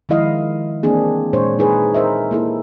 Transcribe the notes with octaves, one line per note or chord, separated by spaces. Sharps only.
D#3 F3 G#3 E4 D#5 F5
E3 A#3 C4 D4 G#4
A#2 G#3 D4 C5 C#5
D#4 G#4 B4
A#4 C5 D#5 E5
A#3 E4 A4